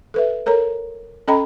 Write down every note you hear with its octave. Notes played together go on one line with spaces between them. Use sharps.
A4 B4 E5
A4 A#4 C#5 A#5
C#4 A4 D#5 G5 A#5 B5